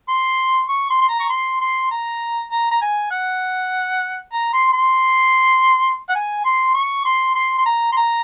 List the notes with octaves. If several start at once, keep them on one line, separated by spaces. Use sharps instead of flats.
C6
C#6
C6
C6
A#5
C#6
C6
C6
A#5
A#5
A#5
G#5
F#5
A#5
C6
C6
F#5
G#5
C6
C#6
C6
C6
C6
A#5
C6
A#5